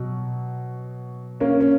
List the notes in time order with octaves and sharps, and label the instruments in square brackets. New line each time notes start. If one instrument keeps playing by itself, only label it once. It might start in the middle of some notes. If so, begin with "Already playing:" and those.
Already playing: [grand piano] B2 F#3
A#3 C#4
C#4